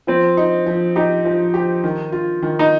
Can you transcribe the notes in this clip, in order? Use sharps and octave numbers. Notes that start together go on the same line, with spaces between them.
F3 C4
D#4
F3
D#4 G4
F3
G4
D#3
F4
D#3
D#4